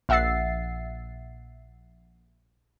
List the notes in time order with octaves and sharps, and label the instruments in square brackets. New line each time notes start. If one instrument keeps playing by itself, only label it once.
[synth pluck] A#1 E5 F#5 E6 A6 C7